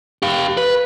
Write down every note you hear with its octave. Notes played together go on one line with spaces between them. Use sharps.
G4 F5
B4